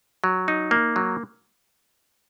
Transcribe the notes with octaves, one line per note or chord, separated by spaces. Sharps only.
F#3
D#4
A#3
F#3